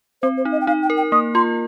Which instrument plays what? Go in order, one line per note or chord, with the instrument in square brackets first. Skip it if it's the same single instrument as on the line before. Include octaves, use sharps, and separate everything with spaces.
[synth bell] C4 [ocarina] C5
[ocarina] C5
[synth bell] D#4
[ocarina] D#5
G5
[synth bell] D#4 [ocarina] F5
[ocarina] G5
[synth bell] A#4
[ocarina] G5
[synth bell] A#3 [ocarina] D#6
[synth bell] F4 [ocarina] C6